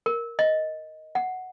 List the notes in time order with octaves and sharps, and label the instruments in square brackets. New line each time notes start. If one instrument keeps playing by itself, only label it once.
[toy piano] A#4
D#5
F#5